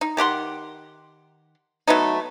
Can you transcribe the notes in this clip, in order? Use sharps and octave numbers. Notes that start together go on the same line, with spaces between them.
D#4
D#3 G4 F#5 C6
F#3 A3 B3 D#4